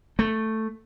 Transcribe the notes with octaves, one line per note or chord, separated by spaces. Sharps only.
A3